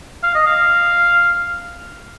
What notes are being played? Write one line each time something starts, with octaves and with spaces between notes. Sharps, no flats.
F5
D#5
F5